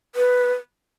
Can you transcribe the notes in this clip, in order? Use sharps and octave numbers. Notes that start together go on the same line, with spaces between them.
B4